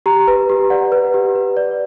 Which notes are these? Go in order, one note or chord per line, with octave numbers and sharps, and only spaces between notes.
G4 A#5
B4
G4
D5 F#5
B4
G4
B4
D5